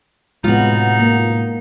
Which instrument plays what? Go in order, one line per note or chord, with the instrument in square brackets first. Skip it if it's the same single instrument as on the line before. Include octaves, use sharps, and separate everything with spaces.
[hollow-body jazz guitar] A2 C3 [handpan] G#3 B3 [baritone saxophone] D#4 [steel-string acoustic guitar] F4 F#4
[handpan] A#3